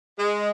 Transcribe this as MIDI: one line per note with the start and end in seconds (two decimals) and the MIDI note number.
0.19 0.50 56